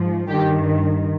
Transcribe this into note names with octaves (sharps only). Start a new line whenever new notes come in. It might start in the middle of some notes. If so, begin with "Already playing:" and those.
Already playing: G#2 F3
G2 D#3 G4